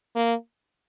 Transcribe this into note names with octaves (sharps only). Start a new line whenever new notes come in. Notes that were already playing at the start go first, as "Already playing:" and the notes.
A#3